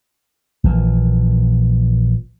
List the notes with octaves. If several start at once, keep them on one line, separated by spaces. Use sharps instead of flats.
A#1 A#2 E3